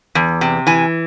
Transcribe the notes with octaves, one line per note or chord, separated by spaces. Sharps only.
E2
C3
E3 G#5